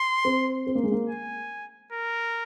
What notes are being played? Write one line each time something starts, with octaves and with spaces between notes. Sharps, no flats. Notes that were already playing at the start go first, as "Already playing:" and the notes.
Already playing: C6
C4
C4
A#3
G#3
A#3
G#5
A#4